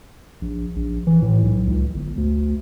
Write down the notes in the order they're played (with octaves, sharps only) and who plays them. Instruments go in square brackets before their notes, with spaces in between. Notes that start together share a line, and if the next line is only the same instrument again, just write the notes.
[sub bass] A#1
A#1
E3
A2
B1
C#2
G1
D2